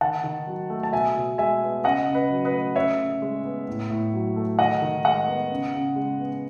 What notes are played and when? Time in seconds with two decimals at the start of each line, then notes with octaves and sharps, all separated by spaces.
0.01 D#3 F#5 A5
0.24 D#3
0.47 F#3
0.70 A3
0.83 A5
0.93 B2 E5 G#5
1.15 B2
1.38 G#3 E5 G#5
1.62 B3
1.84 C#3 D#5 F#5
2.07 C#3
2.15 B4 D#5
2.30 F#3
2.45 B4 D#5
2.52 A3
2.76 C#3 C#5 E5
2.99 C#3
3.22 G#3
3.44 B3
3.68 A2
3.90 A2
4.13 F#3
4.36 A3
4.59 D#3 D#5 F#5
4.82 D#3
5.05 G#3 D#5 F#5
5.28 B3
5.50 C#3
5.73 C#3
5.96 G#3
6.19 B3